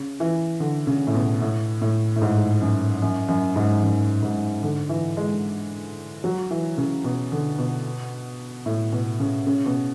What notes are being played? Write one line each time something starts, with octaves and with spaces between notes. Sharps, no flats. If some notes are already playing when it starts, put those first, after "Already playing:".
Already playing: C#3
E3
D3
C#3
A2
B2
A2
A2
A2
G#2
F#2
F#2
F#2
G#2
F#2
G#2
D3
E3
G#3
F#3
E3
C#3
B2
D3
B2
A2
B2
C#3
C#3
B2